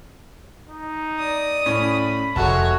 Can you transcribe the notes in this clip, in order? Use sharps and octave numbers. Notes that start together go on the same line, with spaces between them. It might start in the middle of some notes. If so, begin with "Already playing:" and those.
D#4
D5 D#6
A2 C#4 B5
F1 G#3 F#4 A4 C#5 E5 A5